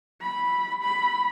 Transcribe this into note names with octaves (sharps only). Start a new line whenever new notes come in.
B5
B5